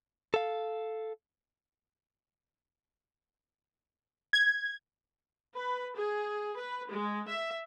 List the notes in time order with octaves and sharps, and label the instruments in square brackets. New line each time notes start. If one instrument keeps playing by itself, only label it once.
[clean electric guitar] A4 F5
[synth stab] G#6
[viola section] B4
G#4
B4
G#3
E5